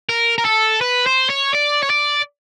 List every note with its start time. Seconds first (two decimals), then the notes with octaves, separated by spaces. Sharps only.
0.09 A#4
0.38 A#4
0.45 A4
0.81 B4
1.06 C5
1.29 C#5
1.53 D5
1.82 C#5
1.90 D5